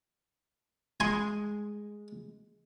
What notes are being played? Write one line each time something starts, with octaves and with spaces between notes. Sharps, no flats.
G#3 G#5 C6